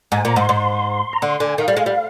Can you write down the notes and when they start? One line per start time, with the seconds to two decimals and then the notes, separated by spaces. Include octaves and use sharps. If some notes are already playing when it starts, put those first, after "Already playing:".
0.12 G#2 G#5
0.25 A#2 A#5
0.36 G#2 C6
0.49 G#2
1.13 A#5
1.22 D3 C6
1.40 D3 G#5
1.58 D#3 F5
1.68 G3
1.77 G#3
1.86 G3